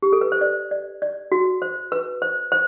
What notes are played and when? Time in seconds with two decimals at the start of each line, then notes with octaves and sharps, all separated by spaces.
0.03 G4
0.13 A4
0.21 B4
0.32 C5
0.41 D5
0.71 D5
1.02 D5
1.32 F#4
1.62 C5
1.92 B4
2.22 C5
2.52 C5